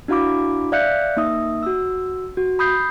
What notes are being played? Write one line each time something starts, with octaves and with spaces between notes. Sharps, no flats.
D4 E4 F#4 F5 B5 D6
D5 E5 F5 F#6 G6 C#7
A#3 D#4 E5 D#6
F#4 E6
F#4
B5 D#6 G6 C7